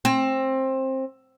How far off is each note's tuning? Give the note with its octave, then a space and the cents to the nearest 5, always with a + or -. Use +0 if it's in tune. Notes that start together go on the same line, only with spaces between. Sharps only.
C4 +20